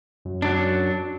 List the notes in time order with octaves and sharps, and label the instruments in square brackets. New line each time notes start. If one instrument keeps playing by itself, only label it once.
[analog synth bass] F#2
[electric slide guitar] F#3 D4